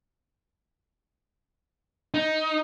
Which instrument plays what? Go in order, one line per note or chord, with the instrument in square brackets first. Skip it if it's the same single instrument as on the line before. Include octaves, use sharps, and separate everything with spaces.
[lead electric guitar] D#4